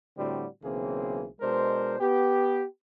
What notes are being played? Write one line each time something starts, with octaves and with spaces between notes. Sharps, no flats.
A2 D3 G3 C4 F#4
B1 C#3 E3 A#3 C4 G#4
B2 G#3 D4 A#4 C5
B3 G4